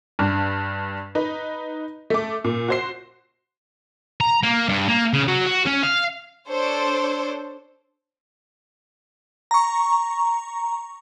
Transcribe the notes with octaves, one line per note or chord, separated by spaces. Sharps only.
G2 D4
D#4 B4
A3 D6
A#2
F#4 C5 C7
A#5
A#3
G2
A#3
C#3
F#3
F#4
C#4
F5
D4 A4 C5 C#5
A#5 C#6